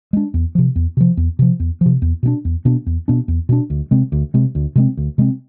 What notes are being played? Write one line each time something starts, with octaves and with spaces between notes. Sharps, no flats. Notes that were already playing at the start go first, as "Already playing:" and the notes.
G#3 D4
E2
C3 F3
E2
C3 F3
E2
C3 F3
E2
C3 F3
E2
B2 B3 D4
E2
B2 B3 D4
E2
B2 B3 D4
E2
B2 B3 D4
D2
C3 G#3 C4
D2
C3 G#3 C4
D2
C3 G#3 C4
D2
C3 G#3 C4